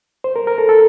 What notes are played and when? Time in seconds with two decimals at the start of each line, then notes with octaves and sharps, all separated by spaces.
0.24 C5
0.36 A#4
0.47 A#4
0.58 A4
0.69 A4